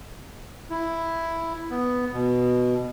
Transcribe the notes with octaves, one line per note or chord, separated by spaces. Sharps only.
E4
B3
B2